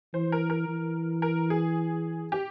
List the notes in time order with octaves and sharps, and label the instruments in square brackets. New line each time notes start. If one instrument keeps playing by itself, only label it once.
[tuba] E3 [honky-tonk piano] C5
[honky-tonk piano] A#4
A#4
[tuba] E3
[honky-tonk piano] A#4
G#4
G4